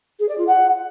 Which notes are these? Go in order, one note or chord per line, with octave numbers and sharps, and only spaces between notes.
G#4
D5
F4
F#5